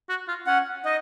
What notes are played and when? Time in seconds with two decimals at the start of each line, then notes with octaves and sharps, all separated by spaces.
0.09 F#4
0.28 F4
0.47 C#4 F#5
0.85 D#4 D#5